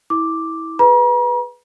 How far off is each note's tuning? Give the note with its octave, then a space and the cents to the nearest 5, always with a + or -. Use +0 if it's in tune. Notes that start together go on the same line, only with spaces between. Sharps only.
E4 -25 D6 +0
G#4 +15 B4 +0 A#5 +45